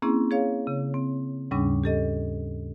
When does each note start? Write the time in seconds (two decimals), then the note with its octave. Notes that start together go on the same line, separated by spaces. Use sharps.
0.02 A#3 C4 C#4 E4 G#4
0.31 G#4 C#5 F5
0.67 C#3
0.94 C4
1.51 D#2 G#2 C#3 G3 C#4 D4
1.84 G4 A4 D#5